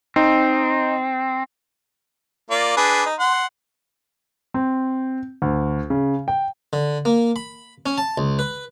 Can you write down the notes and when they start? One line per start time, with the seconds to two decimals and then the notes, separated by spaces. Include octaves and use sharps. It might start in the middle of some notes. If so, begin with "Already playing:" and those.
0.16 C4 D#4
2.50 A#3 F4 D5
2.77 D4 G#4 B4
3.06 D#4
3.20 F#5 C6
4.54 C4
5.42 D2
5.90 C#3
6.28 G5
6.73 D3
7.05 A#3
7.36 B5
7.86 C#4
7.98 A5
8.18 C#2
8.39 B4